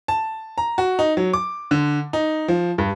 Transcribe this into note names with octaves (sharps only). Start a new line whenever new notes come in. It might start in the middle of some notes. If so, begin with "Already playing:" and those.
A5
A#5
F#4
D#4
F#3
D6
D3
D#4
F3
G2